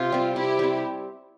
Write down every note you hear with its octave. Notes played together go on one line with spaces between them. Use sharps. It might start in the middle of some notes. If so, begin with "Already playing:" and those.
Already playing: C3 F4
G3 C4
C3 E4 G4
G3 C4